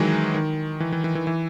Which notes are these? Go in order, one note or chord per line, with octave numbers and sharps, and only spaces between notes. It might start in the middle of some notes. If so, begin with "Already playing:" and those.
Already playing: D#3 E3 F#3 G#3
D#3
E3
E3
E3
E3
E3